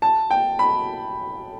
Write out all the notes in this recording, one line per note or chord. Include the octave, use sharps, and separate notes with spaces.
A5
G5
B5